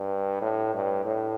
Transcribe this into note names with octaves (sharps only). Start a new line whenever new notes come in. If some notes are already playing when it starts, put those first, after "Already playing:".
Already playing: G2
A2
G2
A2